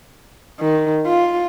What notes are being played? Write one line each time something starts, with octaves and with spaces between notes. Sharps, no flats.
D#3
F4